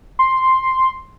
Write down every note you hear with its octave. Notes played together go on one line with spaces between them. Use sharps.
C6